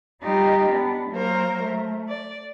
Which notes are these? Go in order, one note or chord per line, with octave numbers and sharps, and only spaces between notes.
G3 D#4 F4 G4
B3 D4
F#3 A#3 A#4 C5 A#5
A3
D5